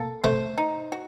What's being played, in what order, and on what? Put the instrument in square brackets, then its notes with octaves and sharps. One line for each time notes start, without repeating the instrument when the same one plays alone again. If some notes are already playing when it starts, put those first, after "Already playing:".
Already playing: [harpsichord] A#3 [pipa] A4
[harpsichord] A3 [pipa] C5
[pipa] D#4
F#4